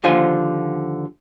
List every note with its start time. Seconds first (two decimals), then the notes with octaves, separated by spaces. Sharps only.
0.04 D#2 D3 F3 F4 C5 G#5